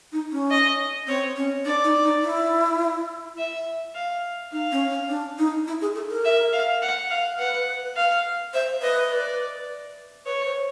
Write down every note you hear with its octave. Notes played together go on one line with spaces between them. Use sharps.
D#4
C#4
D#5
C4 C#5
C#4
D4 D5
D#4
D#4
E4
E5
F5
D#4 F5
C#4
C#4
D4
D#4
E4
G#4
A4
A#4
E5
F5
F#5
F5
B4 F#5
F5
C5 E5
B4 D#5
D5
B4 C#5
C5